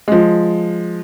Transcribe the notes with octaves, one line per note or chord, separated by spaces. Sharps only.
F3 G#3